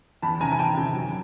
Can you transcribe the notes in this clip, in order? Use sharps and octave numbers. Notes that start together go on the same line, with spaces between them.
E2 A5 B5
C3 D#3 G#5 A#5
G#5
E2 G5 A5
C3 D#3
F#2